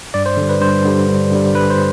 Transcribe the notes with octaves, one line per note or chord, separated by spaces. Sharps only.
G2 D5
C5
D3 G3
B4
G2 C5
D3 G3
G2
D3 G3
G2 B4
C5